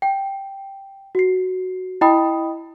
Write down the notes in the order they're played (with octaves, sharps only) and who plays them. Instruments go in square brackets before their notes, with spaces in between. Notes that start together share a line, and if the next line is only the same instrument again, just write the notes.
[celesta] G5
F#4 C7
E4 D#5 G5 B5 D#6